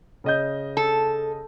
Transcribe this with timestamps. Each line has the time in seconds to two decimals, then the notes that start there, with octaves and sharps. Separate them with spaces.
0.24 C#3 D#5 G6
0.77 A4